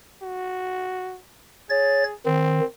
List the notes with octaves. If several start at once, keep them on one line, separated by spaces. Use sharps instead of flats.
F#4
G#4 C#5 A6
D#3 C4